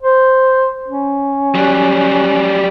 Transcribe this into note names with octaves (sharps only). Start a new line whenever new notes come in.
C5
C#4
F#3 G3